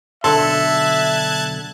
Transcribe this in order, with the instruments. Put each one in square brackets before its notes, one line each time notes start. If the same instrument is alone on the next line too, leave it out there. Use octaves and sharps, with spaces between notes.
[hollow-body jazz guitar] B1 D3 C6 [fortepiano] A4 [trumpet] E5 [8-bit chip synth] A5 F#6 G#6